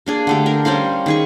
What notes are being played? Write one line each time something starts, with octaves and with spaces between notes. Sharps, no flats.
A#3 D4 G#4
D3 A3 G4
A#4
G3 C#4 C5 F5
D#3 G#4 C#6